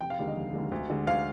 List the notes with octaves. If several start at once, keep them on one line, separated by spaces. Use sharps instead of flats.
F1 G5
F5
D#2 D3 G#3
D#5
F1
D#2 D3 G#3
D2
D3 G#3
D2 F5